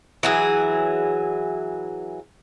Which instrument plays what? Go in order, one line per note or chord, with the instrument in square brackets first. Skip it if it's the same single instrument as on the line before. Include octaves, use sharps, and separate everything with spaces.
[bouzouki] E3 F#3 G#4